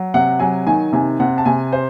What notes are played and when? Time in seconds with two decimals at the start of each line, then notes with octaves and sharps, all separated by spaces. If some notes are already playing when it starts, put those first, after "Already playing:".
Already playing: F#3
0.14 C3 F#5
0.39 F#3 G#5
0.66 D#3 G#5
0.93 C3 G#5
1.20 C3 F#5
1.38 A5
1.45 C3 G#5
1.72 C5